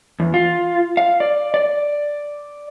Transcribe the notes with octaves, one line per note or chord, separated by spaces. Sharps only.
E2
F4
F5
D5
D5